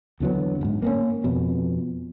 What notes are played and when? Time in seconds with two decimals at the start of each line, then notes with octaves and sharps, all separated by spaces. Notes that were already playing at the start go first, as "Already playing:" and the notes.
0.20 E2 D3 F#3 B3
0.61 E1 G#2
0.82 A#3 C4 C#4
1.24 F2 B2